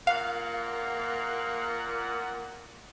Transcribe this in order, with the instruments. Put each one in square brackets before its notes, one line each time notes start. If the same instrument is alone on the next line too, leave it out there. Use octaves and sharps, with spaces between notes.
[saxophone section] A#2 F#5 [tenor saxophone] A#3 [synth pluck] F5